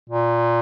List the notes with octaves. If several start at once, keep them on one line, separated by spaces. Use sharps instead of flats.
A#2